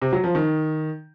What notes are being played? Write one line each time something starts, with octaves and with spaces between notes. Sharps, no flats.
C3
F#3
F3
D#3